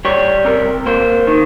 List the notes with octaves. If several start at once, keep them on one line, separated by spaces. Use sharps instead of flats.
G3 C#5
C3 A#4
A#3 C5
D#3